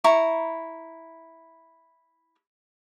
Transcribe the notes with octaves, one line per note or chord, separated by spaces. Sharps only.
E4 A#5 C#6